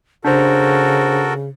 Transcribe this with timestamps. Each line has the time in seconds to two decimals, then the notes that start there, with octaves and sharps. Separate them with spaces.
0.25 C#3 D4 F#4 A4 A#4 C5